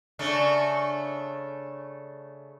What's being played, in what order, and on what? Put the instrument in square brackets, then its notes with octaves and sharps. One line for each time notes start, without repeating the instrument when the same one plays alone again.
[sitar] C#3 A3 D4